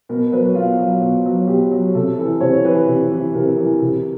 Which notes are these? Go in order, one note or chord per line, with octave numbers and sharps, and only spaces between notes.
B2 A#4
F#3 B4
B2 F4
F#3
B2
F#3
B2 G4
F#3
C3 A4
E3 A4
C3 C#5
E3 B4
C3
E3
C3 A#4
E3
C3